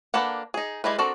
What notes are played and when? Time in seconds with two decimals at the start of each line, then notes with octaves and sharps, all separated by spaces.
0.14 A#3 D4 A4 B4 F#5
0.54 D#4 G#4
0.84 G3 G#3 E4 B4
0.98 C4 D4 F#4 A4 A#4